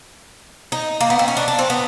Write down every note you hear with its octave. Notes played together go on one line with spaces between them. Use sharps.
D#4
A#3
B3
C4
C#4
D4
D4
C4
B3